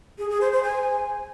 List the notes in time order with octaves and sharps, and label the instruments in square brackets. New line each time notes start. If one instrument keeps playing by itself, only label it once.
[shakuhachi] G#4
G#4
C5
C5
G#5